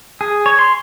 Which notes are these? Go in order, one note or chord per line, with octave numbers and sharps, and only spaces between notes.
G#4
C#5
C6